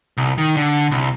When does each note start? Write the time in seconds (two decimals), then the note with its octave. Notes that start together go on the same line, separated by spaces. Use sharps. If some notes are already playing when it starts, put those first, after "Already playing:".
0.17 C2
0.38 D#3
0.57 D3
0.91 C2